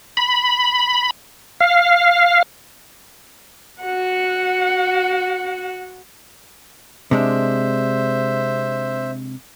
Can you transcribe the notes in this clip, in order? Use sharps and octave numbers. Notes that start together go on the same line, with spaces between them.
B5
F5
F#4 F#5
C3 G#3 D4 C5 E5